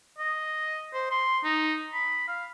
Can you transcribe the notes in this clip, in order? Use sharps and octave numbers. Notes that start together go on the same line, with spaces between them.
D#5
C5
C6
D#4
B5
F5